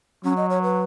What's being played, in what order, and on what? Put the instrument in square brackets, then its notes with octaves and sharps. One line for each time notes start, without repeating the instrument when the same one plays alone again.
[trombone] F#3 [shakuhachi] C#4
[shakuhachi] D#5
C#5
B4